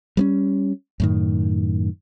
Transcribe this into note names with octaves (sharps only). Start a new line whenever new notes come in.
G3 B3 C#4
F#2 A2 D#3